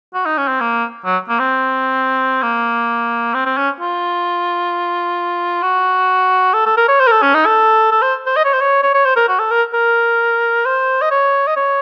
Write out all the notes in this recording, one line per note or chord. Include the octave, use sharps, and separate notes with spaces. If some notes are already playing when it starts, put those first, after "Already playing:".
F#4
D#4
C#4
C4
A#3
F#3
A#3
C4
A#3
C4
C4
C#4
F4
F#4
A4
A4
A#4
C#5
C5
A#4
A4
C#4
D#4
A4
A4
C5
C5
D#5
C#5
C5
C#5
C#5
C#5
C5
A#4
F#4
A4
A#4
A#4
C5
D#5
C#5
D#5
C#5